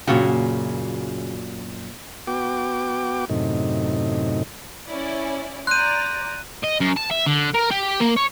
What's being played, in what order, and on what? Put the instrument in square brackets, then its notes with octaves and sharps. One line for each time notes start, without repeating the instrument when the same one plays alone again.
[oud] F#2 A#2 F#4 [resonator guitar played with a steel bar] C#3
[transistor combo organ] B3 F#4 G5 D6
F#2 A2 C3 D#4
[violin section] C#4 E4 D5
[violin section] D5 A#5 [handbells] C6 G6 [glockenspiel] F#6 D#7
[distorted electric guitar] D#5
F#2
A5
E5
D3
A#4
G4
A#3
C#5